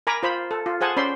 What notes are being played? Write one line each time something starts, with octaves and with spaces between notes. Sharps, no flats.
A#4 G#5 A#5 B5 D6
F4 C5 B5
A4
F4
G#4 C5 F#5 G#5 A5
C#4 C5 D5 B5 C6